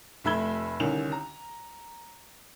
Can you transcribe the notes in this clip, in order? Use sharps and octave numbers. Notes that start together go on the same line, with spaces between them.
F1 A3 E5 B5 G#6 G7
C2 D3 D#3 C#4 F7
A#5